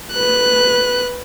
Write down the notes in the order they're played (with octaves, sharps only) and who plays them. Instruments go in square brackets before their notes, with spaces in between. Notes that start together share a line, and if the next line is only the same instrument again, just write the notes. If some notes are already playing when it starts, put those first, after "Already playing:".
[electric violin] B4 F#6